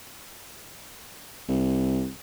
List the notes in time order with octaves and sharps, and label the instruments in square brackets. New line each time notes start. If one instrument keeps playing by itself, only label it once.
[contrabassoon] C2